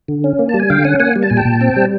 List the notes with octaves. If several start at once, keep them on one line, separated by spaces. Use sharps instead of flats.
D3
C#4
A#3
G3 A5
G#5
D3 F5 G5
C#4 F#5 G#5
A#3 F#5 G#5
G3
A5
A#2 G#5
G5 A5
A#2
C4
G3